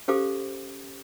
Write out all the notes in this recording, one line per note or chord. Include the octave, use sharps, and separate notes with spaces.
C#4 G4 A4 C5 F5 D6